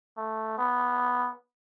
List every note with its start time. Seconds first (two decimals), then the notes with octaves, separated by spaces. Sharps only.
0.17 A3
0.58 B3